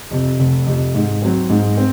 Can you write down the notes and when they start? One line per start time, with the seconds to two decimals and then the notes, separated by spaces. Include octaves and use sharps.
0.11 F2 C3
0.39 F1
0.66 F2 C3
0.95 G#2
1.22 F#3 C4
1.50 G#2
1.77 C4